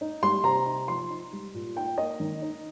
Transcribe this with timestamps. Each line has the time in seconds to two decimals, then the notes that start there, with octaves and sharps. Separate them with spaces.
0.01 D#4
0.23 G3 C6
0.44 C3 A#5
0.66 D#4
0.88 F3 C6
1.10 D#4
1.33 G3
1.54 A#2
1.76 D#4 G5
1.98 A#3 D#5
2.20 D#3
2.42 D#4